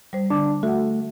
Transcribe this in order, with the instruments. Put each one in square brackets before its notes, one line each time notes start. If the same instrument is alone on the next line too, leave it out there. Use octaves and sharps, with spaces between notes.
[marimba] G3 C5
[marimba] D3 D6 [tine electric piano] D4
[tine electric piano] A3 [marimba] F#4 F#5